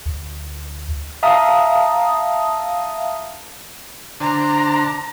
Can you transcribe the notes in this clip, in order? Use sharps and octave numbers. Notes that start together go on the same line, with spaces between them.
D2
E5 F5 A5 A#5 D#6
D3 D4 C5 A#5